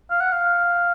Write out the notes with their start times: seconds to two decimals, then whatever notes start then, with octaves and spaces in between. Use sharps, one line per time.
0.11 F5
0.21 F#5
0.33 F5